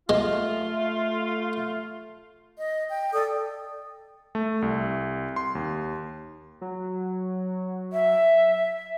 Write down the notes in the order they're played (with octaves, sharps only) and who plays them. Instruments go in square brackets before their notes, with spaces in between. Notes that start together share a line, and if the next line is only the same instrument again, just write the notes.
[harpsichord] G#3 [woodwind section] A3 F4
[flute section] D#5
G5
A4 D5 G5 D#6
[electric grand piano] A3
C2
C6
D#2
[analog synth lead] F#3
[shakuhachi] E5